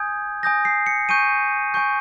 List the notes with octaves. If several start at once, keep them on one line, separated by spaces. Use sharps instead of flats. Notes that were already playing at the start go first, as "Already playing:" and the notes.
Already playing: G#5 D#6 G6 G#6
G#5 D#6 G6 A#6
C7
C#7
G#5 C#6 G6 D#7
G#5 C#6 G6